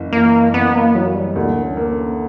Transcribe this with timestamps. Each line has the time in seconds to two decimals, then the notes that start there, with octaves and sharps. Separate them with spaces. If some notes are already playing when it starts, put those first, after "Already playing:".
Already playing: F#1 E3
0.13 E3 A#3
0.54 F#1 B3
0.75 A#3
0.95 E3 F#3
1.15 G3
1.36 D2 A#3
1.63 C#4
1.77 A#3 B3
1.91 C#4